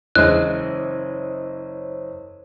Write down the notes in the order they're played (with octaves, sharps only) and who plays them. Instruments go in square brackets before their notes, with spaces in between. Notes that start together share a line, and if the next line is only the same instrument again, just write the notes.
[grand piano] F#1 D#5 [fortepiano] E3 G#3 [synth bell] C5 C#5 [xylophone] F#6